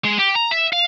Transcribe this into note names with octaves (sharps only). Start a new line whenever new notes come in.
G#3
G4
A#5
E5
F5